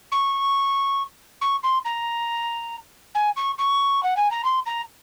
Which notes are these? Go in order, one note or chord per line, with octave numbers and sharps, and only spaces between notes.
C#6
C#6
C6
A#5
G#5
C#6
C#6
F#5
G#5
A#5
C6
A#5